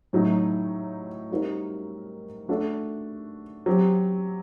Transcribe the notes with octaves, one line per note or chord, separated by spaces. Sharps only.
A2 F#3 A3 D#4
G3 C4 D#4 F#4 A#4
A3 D4 F#4 A4
F#3 C4 G4